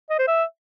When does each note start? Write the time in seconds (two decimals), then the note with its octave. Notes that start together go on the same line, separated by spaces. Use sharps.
0.10 D#5
0.19 C5
0.28 E5